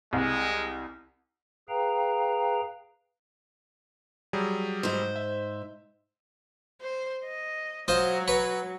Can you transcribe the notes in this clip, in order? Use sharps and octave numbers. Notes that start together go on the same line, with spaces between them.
C2 G#3
G#4 B4 F5 G5 A#5
F#3 G3 G#4
G#2 C5
E5
C5
D#5
F#3 F4 C5 D#5
B4 C#5